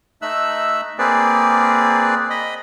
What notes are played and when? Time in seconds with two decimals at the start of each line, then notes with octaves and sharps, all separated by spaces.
0.22 A3 D#4 E5 E6 F#6
0.99 A#3 C4 G#4 B4 D5
2.30 D#5 B5